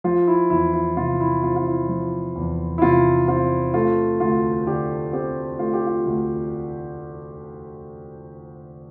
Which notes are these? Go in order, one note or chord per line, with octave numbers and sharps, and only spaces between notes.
F3 F4
E4
E2 E4
E4
C3 F4
E4
C4 F4
F4
E4
F3
E2
E4
C3 F4
C4 F4
A3 F4
D2 F4
D3 G4
C4 G4
A3 F4
G4
F4
D2